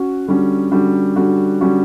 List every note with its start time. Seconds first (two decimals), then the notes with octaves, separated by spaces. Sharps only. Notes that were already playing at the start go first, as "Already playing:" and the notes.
Already playing: C#4 F#4
0.27 D3 G3 C#4 F#4
0.71 D3 G3 C#4 F#4
1.16 D3 G3 C#4 F#4
1.61 D3 G3 C#4 F#4